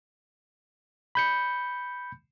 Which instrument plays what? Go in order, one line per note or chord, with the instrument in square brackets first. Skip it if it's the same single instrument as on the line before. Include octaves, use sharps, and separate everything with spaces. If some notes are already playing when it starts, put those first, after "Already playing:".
[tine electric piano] B5 G6 C#7